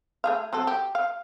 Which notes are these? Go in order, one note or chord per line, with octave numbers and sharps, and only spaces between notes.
A3 G#4 F5
F#3 C4 A4
G4
F5